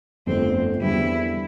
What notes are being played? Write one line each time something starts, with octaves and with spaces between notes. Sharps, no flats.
G1 F2 D3 F3 A3 C4
E2 D3 G3 E4